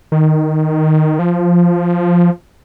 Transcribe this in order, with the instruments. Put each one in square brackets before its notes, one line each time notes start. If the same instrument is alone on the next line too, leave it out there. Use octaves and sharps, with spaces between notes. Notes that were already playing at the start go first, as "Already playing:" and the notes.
[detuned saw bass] D#3
F3